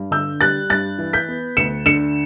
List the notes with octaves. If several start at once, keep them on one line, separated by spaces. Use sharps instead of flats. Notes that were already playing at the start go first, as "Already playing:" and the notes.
Already playing: G2
D3 E6 G6
G3 F#6 A6
G2 F#6 A6
E3
G6 B6
B3
D2 C#7 E7
D3 C#7 E7